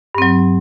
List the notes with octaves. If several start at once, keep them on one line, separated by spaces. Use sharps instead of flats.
G2 F#3 C4